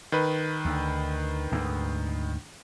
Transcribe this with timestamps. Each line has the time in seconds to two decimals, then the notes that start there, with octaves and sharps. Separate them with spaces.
0.12 D#3 B4
0.65 D2
1.52 D2 G#2